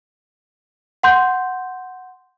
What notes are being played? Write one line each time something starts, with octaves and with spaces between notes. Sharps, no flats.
F#5 C6 G6